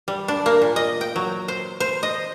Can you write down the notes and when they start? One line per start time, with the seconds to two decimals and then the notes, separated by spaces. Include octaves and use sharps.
0.08 G3
0.28 D4
0.46 A#3
0.62 A#2
0.76 D#5
1.01 G5
1.16 F#3
1.48 C5
1.80 C5
2.03 D#5